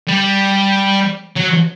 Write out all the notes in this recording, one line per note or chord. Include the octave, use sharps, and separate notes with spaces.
G3
F#3